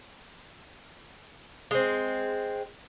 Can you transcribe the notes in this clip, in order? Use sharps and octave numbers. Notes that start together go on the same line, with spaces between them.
G#3 C4